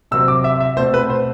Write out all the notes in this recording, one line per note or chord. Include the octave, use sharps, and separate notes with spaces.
C3 F#3 C4 E6
D6
E5
E5
B2 A3 C4 C5
B4
C5